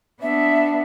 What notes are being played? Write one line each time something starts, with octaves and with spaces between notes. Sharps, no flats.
B3 D4 E5